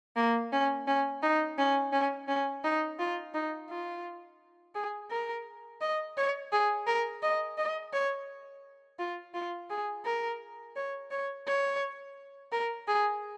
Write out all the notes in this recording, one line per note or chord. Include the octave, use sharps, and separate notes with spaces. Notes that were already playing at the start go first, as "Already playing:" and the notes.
A#3
C#4
C#4
D#4
C#4
C#4
C#4
D#4
F4
D#4
F4
G#4
A#4
D#5
C#5
G#4
A#4
D#5
D#5
C#5
F4
F4
G#4
A#4
C#5
C#5
C#5
A#4
G#4